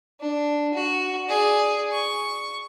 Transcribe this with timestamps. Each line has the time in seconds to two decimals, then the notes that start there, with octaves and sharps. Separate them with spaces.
0.20 D4
0.74 F#4
1.28 G#4 D5
1.92 C#6